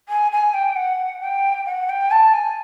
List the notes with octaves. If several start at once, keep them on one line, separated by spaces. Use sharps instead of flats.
G#5
G#5
G5
F#5
G5
F#5
G5
A5
G#5